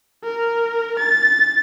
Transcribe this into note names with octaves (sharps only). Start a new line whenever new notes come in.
A#4
A6